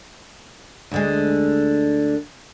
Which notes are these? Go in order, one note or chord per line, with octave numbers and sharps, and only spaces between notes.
D2 D3 G#3